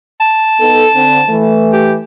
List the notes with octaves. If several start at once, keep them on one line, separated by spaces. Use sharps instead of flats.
A5
B3 D#4 A4
D3 C4
E3 A3
G4